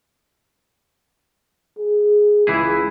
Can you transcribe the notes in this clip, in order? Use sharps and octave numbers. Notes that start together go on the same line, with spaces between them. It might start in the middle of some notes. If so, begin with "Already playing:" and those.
G#4
C#2 E3 E4 G#4